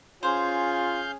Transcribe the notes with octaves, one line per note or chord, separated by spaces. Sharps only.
C#4 F4 G#4 C5 F5 G6